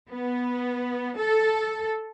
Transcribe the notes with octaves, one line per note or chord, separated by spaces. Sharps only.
B3
A4